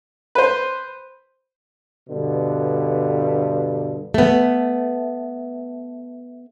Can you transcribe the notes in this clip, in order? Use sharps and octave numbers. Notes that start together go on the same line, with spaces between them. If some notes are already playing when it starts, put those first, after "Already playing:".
B4 C5
G2 B2 D3
A3 B3